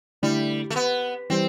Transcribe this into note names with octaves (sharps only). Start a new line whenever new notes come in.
D3 G3 A3 E4
A3
B3
E3 G3 C4